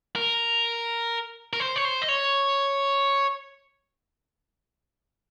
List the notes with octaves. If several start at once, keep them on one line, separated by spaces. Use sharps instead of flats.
A#4
A#4
C5
C#5
C5
D#5
C#5